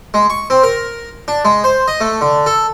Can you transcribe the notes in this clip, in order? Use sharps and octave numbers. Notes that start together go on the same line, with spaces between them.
G#3
C#6
C4
A#4
D4
G#3
C5
D#5
A3
D3
A4